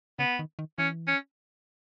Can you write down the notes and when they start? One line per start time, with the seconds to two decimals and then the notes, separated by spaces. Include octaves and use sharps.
0.19 C#3 B3
0.39 D#3
0.59 D#3
0.78 E3 C#4
1.08 C#4